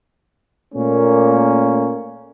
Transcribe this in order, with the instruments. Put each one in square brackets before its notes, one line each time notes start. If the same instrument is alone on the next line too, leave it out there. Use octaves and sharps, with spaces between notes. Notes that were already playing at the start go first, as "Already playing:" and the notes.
[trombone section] A#2 A3 A#3 C#4